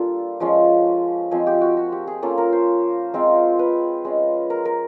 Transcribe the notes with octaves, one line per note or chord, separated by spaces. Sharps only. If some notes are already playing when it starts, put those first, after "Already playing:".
Already playing: G3 A#3 D4 F4 A4
F3 G#3 C#4 F4
F3 G#3 C4 G#4
G4
F#4
F#4
G4
G#4
A#3 C#4 F4 A4
A#4
C5
G#3 C4 F4
B4
G#3 C#4 F4
A#4
A#4